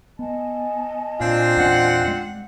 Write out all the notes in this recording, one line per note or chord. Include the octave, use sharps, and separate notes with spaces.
B3 D#5 G#5 A5
A#2 C4 D4 F4
E2 A#2 C#4 F#5
G#3